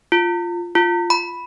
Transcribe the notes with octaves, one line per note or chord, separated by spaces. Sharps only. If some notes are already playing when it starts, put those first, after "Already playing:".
F4
F4
B5